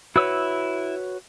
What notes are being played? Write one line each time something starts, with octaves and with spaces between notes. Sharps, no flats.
E4 F#4 B4 C#5 E6